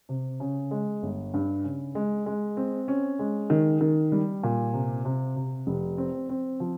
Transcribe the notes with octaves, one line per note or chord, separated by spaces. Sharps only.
C3
C#3
G#3
G1
G2
C#3
G#3
G#3
C4
C#4
G#3
D#3
D#3
G3
A#2
C3
C3
C3
F1
C4
C4
F3